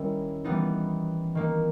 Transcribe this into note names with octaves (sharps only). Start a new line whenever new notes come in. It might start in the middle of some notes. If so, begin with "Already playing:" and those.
Already playing: D#3 G3 C#4 E4
E3 G3 B3 D#4
D#3 A#3 D#4